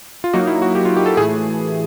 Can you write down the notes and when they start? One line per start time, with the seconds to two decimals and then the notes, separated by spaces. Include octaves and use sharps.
0.24 F4
0.33 F#3 A#3 D#4 F#4
0.47 E4
0.62 F#4
0.75 G4
0.85 F4
0.97 G4
1.06 A4
1.17 A2 E3 A3 G#4